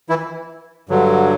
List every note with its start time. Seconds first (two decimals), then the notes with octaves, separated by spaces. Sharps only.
0.09 E3 E4
0.89 G2 D3 F#3